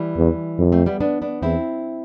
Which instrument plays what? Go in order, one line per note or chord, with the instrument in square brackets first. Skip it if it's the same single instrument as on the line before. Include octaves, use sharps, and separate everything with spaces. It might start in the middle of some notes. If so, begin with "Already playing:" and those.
Already playing: [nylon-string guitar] E3 G3
[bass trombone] E2
F2
[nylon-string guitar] A3 C4
G3 B3
B3 D4
B3 D4
[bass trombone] E2 [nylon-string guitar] C4 E4